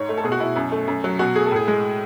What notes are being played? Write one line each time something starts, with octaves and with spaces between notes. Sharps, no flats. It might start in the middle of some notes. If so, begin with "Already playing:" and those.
Already playing: G#2 C#5
A3
A4
B2 G#4
F#4
B2 E4
F#2
A3
F#2
F#3
B2 F#4
A3 G#4
A4
A2
G#4
G#3